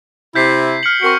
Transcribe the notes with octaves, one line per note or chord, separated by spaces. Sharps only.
C3 E4 G6 B6 C7
F6 C#7 F#7
C4 F#4 A#4 C#6 C#7